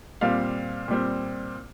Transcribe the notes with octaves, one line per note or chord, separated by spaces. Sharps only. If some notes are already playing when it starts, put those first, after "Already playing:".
A#2 G3 C4 F5
A#2 G3 C4